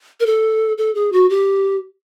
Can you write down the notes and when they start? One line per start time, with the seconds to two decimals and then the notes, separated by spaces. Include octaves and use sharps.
0.20 A#4
0.26 A4
0.78 A4
0.95 G#4
1.12 F#4
1.30 G4